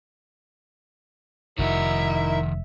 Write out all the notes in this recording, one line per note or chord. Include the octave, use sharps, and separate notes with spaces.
F1 D#3 D#4 E4 F#4 A#4 E5